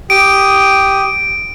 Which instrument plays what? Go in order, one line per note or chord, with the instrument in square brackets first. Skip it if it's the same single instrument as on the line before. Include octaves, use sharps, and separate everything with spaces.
[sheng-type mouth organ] G4 D#6 [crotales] D7